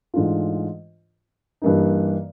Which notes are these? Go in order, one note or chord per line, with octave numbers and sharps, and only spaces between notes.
G#2 E3 A3 D4 F4
G2 E3 G3 A#3 D#4